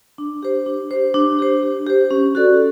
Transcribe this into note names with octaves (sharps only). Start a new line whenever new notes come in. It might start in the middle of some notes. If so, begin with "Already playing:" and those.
D4
G4 C5
D4
G4 C5
D4
G4 C5
D4
G4 C5
C#4
F#4 A4 D5